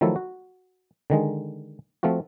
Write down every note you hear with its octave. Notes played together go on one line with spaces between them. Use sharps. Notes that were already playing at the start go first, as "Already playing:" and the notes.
D#3 F3 F#3 A3 E4 A4
F#4
D3 D#3 G#3
F3 A3 C4 F4 F#4